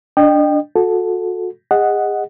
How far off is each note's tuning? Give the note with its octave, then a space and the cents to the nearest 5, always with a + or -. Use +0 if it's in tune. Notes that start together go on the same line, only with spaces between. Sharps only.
D4 -5 D#5 -35 G5 +0
F#4 -30 A4 -5
G#4 -35 D#5 +0 F#5 +0